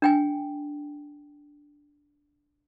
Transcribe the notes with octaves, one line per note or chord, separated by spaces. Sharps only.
D4 G5 G#5